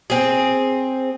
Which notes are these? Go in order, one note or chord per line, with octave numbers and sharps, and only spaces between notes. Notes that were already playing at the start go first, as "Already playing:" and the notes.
C4 G#4